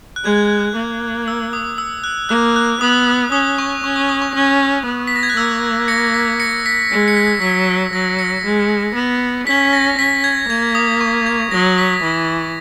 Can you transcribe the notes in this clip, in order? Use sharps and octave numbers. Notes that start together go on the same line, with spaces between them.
F#6
G#3 G#6
A#3
E6
D#6
E6
F#6
A#3 F#6
F#6
B3 D#6
C#4 D#6
C#6
C#4 C#6
D#6
D#6
C#6
C#4
B3
B6
A#6
G#6
F#6
A#3 E6
A#6 C#7
B6
A#6 C#7
B6
G#3 B6
C#7
B6
F#3 B6
F#3 A#6
A#6 C#7
G#3
B3
C#4 B6
A#6
C#4 B6
G#6
A#3 G#6
D#6
C#6
G#6
F#3 A#6
B6
B6
E3 A#6